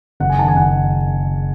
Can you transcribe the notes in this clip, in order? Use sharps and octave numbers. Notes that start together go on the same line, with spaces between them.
F#1 F#5
G#5
D#3 A5
G#5
F#1 F#5